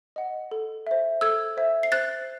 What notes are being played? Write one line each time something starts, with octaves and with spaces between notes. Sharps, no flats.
D#5 F#5
A4
C5 E5
A4 E6 G#6
C5 E5
C7
C5 F#6 A6